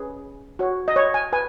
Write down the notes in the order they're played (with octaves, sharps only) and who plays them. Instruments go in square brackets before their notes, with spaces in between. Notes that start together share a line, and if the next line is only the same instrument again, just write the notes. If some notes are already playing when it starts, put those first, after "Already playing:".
Already playing: [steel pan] C#4 G#4 B4
F#4 C#5
D#5
C#5
G#5
B4 G#5